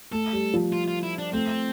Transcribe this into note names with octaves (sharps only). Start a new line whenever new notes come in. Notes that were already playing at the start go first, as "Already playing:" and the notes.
A3 A4
G3
F3
F4
F4
E4
D4
A3 C4